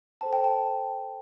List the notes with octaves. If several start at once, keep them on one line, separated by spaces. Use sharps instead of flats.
A4 C5 G5 A5
G5
A5